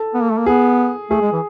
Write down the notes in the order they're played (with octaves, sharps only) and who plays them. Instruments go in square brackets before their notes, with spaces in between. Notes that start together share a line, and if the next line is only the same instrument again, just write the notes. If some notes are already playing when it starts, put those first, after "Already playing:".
Already playing: [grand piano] A4
[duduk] B3
A#3
A3
A#3
[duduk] B3 [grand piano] G#4
[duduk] A3 [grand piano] G#4
[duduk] G#3
E3